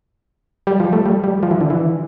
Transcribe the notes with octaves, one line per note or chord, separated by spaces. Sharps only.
G3
F3
A3
G3
G3
F3
E3
D3
E3